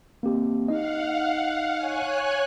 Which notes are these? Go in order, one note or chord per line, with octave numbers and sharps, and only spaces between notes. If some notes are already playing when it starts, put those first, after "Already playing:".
A#3 C4 G4
D#4 D#5 F5 F#5
C#5 G#5 F#6